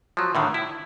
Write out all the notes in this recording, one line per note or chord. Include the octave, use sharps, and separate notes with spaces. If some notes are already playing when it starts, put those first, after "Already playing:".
F3 F#3
A2 D3 D#3
E4